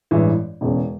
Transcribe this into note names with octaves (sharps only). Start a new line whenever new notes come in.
A1 G2 E3 G#3
E1 E2 C#3